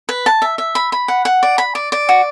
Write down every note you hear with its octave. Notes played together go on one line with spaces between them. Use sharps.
B4
A5
E5
E5
B5
B5
F#5
F#5
D5
B5
D5
D5
F#4